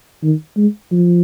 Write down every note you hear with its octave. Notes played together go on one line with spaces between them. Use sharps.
D#3
G#3
F3